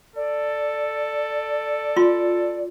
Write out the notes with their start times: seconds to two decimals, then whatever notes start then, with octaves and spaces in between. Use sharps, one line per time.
0.16 A4 D5
1.96 F4 C6